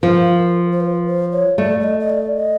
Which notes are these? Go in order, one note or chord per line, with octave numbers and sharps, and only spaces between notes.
F3 A#4
C5
B4
C5
C#5
A3 D5
D5
D#5
D#5
D5
D#5